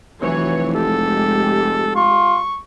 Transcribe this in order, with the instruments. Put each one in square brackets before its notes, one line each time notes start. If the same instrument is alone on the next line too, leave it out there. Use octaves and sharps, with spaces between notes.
[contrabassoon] F1 [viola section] E3 F#3 C#5
[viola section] G#3 G4 [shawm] A4
[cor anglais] F4 [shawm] C#6